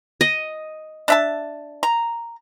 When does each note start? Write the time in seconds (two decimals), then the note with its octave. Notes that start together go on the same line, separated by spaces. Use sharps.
0.21 D#5
1.08 D4 E5 A5
1.83 A#5